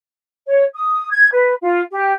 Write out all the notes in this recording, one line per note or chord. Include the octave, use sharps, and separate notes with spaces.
C#5
D#6
G#6
B4
F4
G4